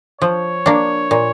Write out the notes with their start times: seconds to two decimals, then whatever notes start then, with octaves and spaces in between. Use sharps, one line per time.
0.21 F3 C#5
0.66 A#3 D4
1.11 A#2